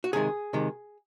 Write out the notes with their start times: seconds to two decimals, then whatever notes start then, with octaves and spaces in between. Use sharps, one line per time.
0.04 F#4
0.13 C3 D#3 G#3 G#4
0.53 C3 D#3 G#3